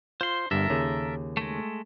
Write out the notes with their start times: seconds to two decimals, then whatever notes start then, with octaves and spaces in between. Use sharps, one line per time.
0.21 F4 C5 C6
0.51 G1 G2 A4 A#4 E5
0.70 D#2 C#3
1.37 G#3 A3